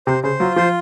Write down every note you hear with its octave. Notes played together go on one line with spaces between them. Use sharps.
C3 C5
C#3 C5
F#3 F4
F3 C5